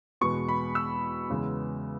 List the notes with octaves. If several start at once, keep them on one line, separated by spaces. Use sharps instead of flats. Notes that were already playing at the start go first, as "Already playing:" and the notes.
E2 B2 G#3 B3 C#6
B5
E6
E2 C#3 G#3 B3